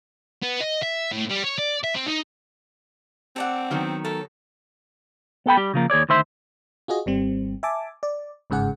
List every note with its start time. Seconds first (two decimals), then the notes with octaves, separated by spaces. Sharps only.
0.42 B3
0.60 D#5
0.82 E5
1.12 A2
1.30 G3
1.44 C#5
1.58 D5
1.84 E5
1.95 C4
2.06 D#4
3.36 C4 A4 D5 F#5
3.71 D#3 F#3 B3
4.05 A4 A#4
5.46 B3 A4 G5 B5
5.57 G3 G4
5.74 C#3 F3 A#3
5.90 D#2 G#4 C#5 D5
6.09 D2 D#3 C5 E5 C6
6.88 F4 F#4 G#4 D#5
7.06 G#1 G3 C4
7.63 E5 G#5 A5 D6
8.03 D5
8.50 G1 G#2 C#3 G#4 F#5